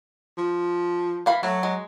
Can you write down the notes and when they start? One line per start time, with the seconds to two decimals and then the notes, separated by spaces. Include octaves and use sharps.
0.38 F3
1.26 E3 F5 B5
1.43 F#3 A3
1.63 G#3